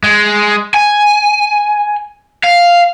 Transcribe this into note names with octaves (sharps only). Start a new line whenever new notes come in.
G#3
G#5
F5